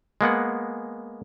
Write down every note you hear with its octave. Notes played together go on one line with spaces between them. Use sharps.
G#3 A#3 B3 F#5